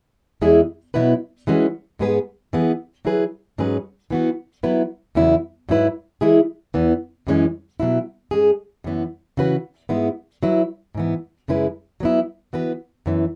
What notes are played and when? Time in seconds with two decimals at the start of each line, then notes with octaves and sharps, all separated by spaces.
0.41 E2 E3 G#3 E4 G#4
0.94 B2 F#3 B3 E4 B4
1.47 E3 G#3 C#4 F#4 B4
1.99 G#2 G#3 B3 G#4 B4
2.53 E3 B3 G#4
3.05 F#3 E4 G#4 B4
3.58 G#2 F#3 C#4 G#4 B4
4.10 E3 B3 F#4
4.63 F#3 B3 E4 B4
5.15 E2 C#3 F#3 B3 E4
5.69 G#2 F#3 E4 B4
6.21 E3 G#3 E4 G#4
6.74 E2 E3 B3
7.27 F#2 E3 G#3 C#4
7.80 B2 F#3 E4
8.31 G#2 G#3 C#4 G#4
8.84 F#2 E3 B3
9.37 C#3 E3 C#4 F#4 B4
9.89 G#2 G#3 B3 E4
10.43 F#3 E4 B4
10.95 G#2 E3 B3
11.48 F#2 C#3 G#3 E4 B4
12.00 F#3 B3 E4
12.53 E3 B3 F#4 B4
13.06 F#2 E3 B3